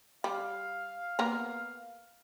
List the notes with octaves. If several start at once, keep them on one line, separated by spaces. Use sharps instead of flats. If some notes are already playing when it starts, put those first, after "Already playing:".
G3 F5
A#3 B3 A#4